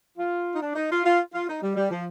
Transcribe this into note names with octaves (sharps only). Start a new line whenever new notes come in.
F4
D#4
D4
D#4
F4
F4
F4
D#4
G3
G3
F3